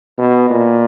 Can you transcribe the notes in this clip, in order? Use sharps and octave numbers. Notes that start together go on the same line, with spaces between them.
B2
A#2